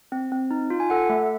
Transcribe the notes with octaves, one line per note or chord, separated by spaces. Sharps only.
C4
C4
D#4
F4
G#5
A4 F#5
A3 E5